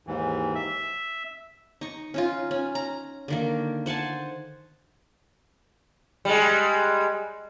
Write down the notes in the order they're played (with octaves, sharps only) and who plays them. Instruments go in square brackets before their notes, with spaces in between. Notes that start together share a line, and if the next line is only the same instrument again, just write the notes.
[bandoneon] D#2 G#2 E3
E5
[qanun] D#4 C#6
C#4 D#4 F4
C#4
A#5
D3 D#3 A#3
C5 F#5 G#5 A5
[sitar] G3 G#3